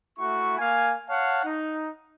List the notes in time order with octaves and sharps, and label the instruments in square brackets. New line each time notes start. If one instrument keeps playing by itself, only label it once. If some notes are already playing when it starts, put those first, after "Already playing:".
[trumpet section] A3 E4 F#4 C#6
A#3 F5 G#5
C#5 F5 F#5 A5
D#4